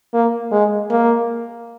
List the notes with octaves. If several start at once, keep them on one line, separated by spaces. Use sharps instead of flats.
A#3
G#3
A#3